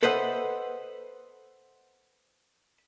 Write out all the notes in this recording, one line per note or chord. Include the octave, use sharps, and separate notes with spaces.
A4 B4 C5 D#5 E5 F#5